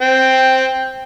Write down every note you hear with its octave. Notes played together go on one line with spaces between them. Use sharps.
C4 G5